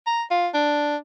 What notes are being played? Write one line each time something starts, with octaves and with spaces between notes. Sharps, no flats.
A#5
F4
D4